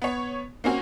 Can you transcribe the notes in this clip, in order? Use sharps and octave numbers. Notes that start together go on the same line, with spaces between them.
B3 C#5
A#3 C4 C#4 F#4